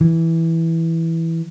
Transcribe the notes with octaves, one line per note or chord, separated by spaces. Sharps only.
E3